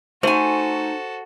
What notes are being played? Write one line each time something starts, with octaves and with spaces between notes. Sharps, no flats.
A3 D#4 F#4 A4 C5 G#5